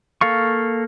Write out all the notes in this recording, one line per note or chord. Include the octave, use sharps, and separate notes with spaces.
A#3 A4 F5 C#6